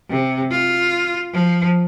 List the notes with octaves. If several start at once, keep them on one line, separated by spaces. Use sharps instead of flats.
C3
F4
F3